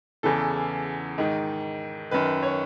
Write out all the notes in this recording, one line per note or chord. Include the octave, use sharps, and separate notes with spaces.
E2 C#3 E3 A4
G#2 D#3
F#2 D#3 B4
C#5